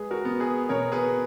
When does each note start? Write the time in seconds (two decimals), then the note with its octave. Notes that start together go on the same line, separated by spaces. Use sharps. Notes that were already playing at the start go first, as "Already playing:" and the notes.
Already playing: G#3 G#4 B4
0.11 F#4 A#4
0.25 B3
0.40 G#4 B4
0.69 B2 A#4 C#5
0.92 G#4 B4